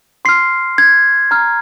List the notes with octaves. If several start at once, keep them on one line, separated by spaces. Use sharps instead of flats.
C6 F6 C7
G#6
A#5 F6